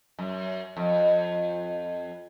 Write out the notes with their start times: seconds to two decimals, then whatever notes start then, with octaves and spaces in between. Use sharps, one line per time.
0.19 F#2
0.77 F2